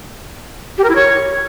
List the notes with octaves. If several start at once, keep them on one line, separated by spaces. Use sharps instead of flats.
G4
A#4
E4
C#5